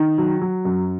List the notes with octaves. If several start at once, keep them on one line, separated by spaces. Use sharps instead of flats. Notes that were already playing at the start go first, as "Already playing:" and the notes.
Already playing: D#3
F#3
F#3
F#2